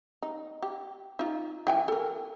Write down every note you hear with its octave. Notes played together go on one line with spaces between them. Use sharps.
D#4
G4
D#4 F4
E3 G5 G#5
A4 A#4